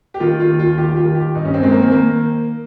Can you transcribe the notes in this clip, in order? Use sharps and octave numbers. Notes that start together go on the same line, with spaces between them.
G4
D#3 F4
F4
D#2
F4
D#3 G4
G4
F4
D#3
G4
G2 D#4
C#4
C4
D#3 G#3
A#3
C4
D#3 A#3